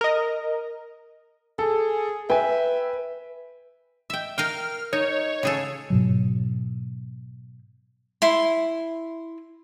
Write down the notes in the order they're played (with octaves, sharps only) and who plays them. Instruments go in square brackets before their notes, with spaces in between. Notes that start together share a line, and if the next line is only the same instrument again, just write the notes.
[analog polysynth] A#4 D#5
[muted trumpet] G#4 [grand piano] A4
[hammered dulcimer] B4 [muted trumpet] E5 [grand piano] G5 G#5
[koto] E5 G5
[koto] A#4 F5 G5 [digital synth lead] F6
[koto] D#4 [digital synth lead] C#5
[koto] C#3 G#4 A4
[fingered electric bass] G#2 B2 F#3
[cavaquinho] E4 C6